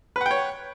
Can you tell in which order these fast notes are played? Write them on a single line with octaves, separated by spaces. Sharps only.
B4 F#5 G5 C#5